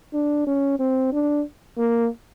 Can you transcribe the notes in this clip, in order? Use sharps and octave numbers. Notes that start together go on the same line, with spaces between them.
D4
C#4
C4
D4
A#3